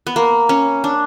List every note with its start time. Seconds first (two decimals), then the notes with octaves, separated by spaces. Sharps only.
0.07 B3
0.16 A#3
0.49 C#4
0.84 D4